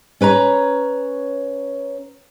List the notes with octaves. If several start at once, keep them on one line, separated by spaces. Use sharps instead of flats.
C#4 B4 C#5 A#5